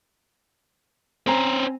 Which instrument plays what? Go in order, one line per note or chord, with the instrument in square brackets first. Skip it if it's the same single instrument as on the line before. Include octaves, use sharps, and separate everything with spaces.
[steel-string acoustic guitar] C4 G#5 A#5 [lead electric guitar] C#4 C5